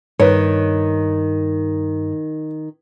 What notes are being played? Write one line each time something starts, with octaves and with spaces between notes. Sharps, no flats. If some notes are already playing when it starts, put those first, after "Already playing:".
G2 D#3 B4 C#5